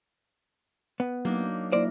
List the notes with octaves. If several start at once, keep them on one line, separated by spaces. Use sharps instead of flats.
B3
F#3 A#3 D4 D#4
F#3 A#3 E4 A#4 C5 D5